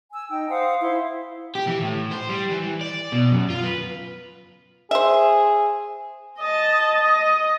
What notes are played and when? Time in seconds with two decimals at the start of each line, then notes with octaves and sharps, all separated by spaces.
0.11 G#5 E6
0.29 D#4 G5 E6
0.50 C5 F5 F#5 D#6
0.81 E4 C5 F5 C6
1.55 G4
1.67 E3
1.81 A2
2.11 C5
2.29 G3
2.50 E3
2.81 D5
3.12 B2
3.32 F#2
3.50 F4
3.64 B4
4.91 G#4 C5 E5
6.39 D#5 A5
7.00 D#5